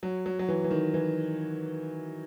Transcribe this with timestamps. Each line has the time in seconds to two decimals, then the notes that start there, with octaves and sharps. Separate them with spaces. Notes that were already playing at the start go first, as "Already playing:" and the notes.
0.03 F#3
0.26 F#3
0.39 F#3
0.49 E3
0.64 E3
0.71 D#3
0.94 E3